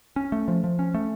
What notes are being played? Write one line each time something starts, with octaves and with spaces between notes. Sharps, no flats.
C#4
A3
F3
F3
C#4
A3